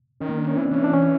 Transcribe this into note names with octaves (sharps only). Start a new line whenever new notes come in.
D#3 C#4
A#3
D4
C#4
E3 C4
D4
E3 C#4
D4
C#4